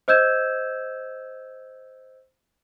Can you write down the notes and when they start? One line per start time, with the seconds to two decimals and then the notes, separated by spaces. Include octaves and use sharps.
0.08 C5 D#5 E6 G6 G#6 E7